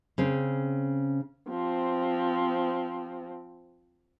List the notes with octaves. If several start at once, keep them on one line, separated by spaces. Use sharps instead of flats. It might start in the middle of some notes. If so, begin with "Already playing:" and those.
C#3 C4 C#4
F3 C4